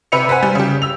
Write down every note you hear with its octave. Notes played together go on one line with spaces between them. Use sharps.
C3 B4 E5 C#7 F7
B4 C5 F#5 G#5
G3
C#3 G4
E6 F7